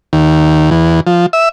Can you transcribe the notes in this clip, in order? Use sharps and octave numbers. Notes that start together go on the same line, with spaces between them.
D#2
E2
F3
E5